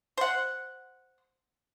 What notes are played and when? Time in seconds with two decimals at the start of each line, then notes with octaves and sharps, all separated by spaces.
0.17 C5 F#5